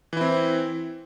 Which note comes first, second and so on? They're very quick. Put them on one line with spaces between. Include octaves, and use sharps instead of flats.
E3 E4 C4